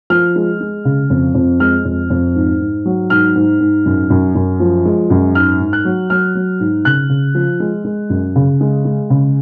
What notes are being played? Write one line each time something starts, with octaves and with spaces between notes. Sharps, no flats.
F3 F6
G#3
G#3
C#3
F2
F2
G#3 F6
F2
F2
G#2
G#2
F#3
G#2 F6
G#2
G#2
F#2
F#2
F#2
F3
G#3
F#2
G#2 F6
G#2
F#6
F#3
F#3 F6
F#3
G#2
C#3 F#6
C#3
F3
G#3
G#3
F#2
C#3
G#3
G#3
C#3